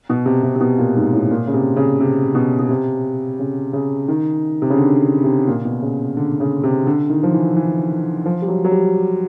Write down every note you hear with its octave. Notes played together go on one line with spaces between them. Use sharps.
B2
C3
C3
C3
B2
A#2
G#2
A2
A#2
C#3
C3
C#3
C3
B2
B2
C3
C#3
C#3
D#3
C3
C#3
D3
C3
A#2
B2
C#3
D3
C#3
C3
D3
D#3
F3
E3
E3
F3
G3
F#3
F#3
G3